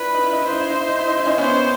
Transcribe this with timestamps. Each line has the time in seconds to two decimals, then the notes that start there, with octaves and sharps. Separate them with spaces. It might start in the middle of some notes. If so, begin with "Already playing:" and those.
Already playing: D4 E4 F4 B4
0.14 D#4
0.24 E4
0.33 D#4
0.42 E4 C5
0.52 D#4
0.60 E4
0.70 D#4
0.80 E4
0.89 D#4
0.99 E4
1.07 D#4
1.17 E4
1.26 C#4 D#4
1.38 B3 C#4 C5